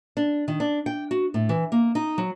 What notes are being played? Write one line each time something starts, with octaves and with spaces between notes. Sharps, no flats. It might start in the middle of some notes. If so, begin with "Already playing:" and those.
D4
D#3
D4
G5
F#4
A2
E3
A#3
D#4
F#3